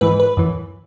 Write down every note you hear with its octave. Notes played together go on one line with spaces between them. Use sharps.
G#2 E3 B4
B4
F#2 E3